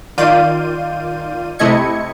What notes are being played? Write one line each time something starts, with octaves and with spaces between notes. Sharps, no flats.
D#3 F4 D5 F5 G6 D#7
C3 A3 E4 D#5 G#6 C#7